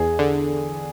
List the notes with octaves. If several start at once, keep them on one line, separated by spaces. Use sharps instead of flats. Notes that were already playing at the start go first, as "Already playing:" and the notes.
Already playing: E2 G#4
D3